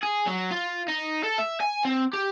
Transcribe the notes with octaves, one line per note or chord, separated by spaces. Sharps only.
G#4
F#3
F4
D#4
A4
E5
G#5
C4
G4